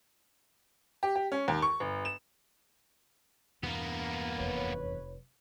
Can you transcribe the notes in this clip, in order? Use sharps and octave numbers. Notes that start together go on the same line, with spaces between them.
G4
G4
C#4
D#2
C#6
G1
E7
E2 G2 B2 A#3 B3 D4
F1 F2 B4 C#5